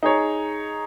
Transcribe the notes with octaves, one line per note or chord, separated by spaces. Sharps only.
D#4 G#4 C#5